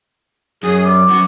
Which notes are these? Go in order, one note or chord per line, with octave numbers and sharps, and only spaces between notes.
F#2 G#4 D#6
G3 B3 D6
F#2 B3 F#4